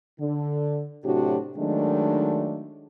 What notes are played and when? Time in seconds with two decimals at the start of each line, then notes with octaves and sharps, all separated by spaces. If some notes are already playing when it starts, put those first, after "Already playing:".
0.20 D3
1.05 A2 C3 F#3 D4 F#4 G4
1.58 D#3 F#3 G#3 A3 D4